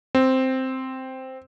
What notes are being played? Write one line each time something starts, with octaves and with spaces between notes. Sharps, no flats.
C4